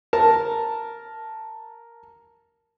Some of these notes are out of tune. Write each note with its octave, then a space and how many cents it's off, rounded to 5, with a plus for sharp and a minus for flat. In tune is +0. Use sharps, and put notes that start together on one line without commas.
A#4 +0 A5 +0